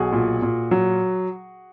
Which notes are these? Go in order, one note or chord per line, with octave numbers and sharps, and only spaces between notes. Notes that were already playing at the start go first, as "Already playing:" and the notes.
Already playing: B1 F#4 G#4
A#2
A#2
F#3